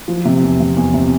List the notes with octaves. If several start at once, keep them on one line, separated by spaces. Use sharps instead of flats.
F3
C3
E2
C3
E2
C3